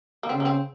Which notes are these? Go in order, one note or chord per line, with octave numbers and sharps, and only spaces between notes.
A#3
C#3 C4
A#3
C4